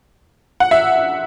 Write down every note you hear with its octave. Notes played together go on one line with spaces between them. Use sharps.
F#5
E5